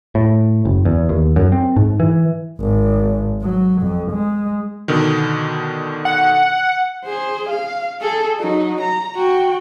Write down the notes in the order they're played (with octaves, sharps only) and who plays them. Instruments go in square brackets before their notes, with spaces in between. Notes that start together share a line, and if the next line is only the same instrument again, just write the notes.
[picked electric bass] A2
F#1
E2
D#2
F#2
C4
G#2
E3
[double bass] G#1
F#3
F2
G#3
[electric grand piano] B2 D3 D#3
[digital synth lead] F#5
[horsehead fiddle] G#4 C5
F5
G#4 A4
F#3 D#4
A#5
F#4 G5